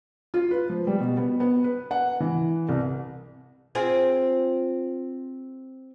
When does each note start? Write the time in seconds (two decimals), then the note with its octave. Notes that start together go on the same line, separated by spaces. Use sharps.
0.34 F4
0.51 B4
0.70 F3
0.87 G3
1.00 B2
1.17 B3
1.40 B3
1.64 B4
1.91 F#5
2.20 E3
2.69 C2
3.75 C4 F4 G#4